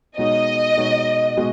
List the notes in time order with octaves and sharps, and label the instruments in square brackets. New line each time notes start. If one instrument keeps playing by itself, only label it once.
[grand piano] B2 G#3 D#4 F#4 C#5 [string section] D#5
[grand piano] B2 G#3 D#4 F#4 C#5
B2 G#3 F#4